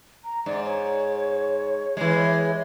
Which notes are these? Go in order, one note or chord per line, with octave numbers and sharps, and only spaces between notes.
A#5
G#2 D5
C#5
E3 G#3